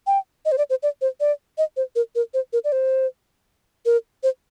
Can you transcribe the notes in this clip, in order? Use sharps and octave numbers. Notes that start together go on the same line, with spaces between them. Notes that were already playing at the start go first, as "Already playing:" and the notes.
G5
D#5
C5
D5
C5
D5
C5
D5
D#5
C5
A#4
A#4
C5
A#4
D5
C5
A#4
C5